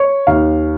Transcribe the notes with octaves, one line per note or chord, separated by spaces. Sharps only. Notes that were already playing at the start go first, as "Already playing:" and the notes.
Already playing: C#5
D#2 F5